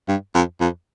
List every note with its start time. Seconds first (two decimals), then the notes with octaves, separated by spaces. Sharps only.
0.08 G2
0.34 F2
0.61 F2